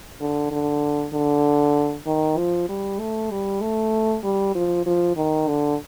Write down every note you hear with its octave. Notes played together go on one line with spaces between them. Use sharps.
D3
D3
D3
D#3
F3
G3
A3
G3
A3
G3
F3
F3
D#3
D3